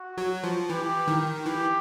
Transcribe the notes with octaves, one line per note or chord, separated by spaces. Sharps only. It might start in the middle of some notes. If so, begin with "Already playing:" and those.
Already playing: F#4
F#3
F3
E3 G4
D#3
E3 G4